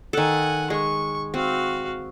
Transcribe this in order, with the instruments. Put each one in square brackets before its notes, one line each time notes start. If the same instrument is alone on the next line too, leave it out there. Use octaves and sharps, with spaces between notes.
[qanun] D#3 A4 [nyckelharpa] F#5 G#5
[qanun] G#3 [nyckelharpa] C#6
[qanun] C4 [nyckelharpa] F#4 F5